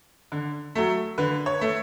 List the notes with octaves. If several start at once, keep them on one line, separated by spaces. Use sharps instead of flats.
D3
F#3 A3
D3 B4
C#5
A3